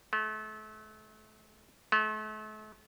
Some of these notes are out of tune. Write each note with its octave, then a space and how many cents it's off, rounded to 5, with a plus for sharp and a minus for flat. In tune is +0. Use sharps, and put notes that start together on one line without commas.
A3 -35
A3 -40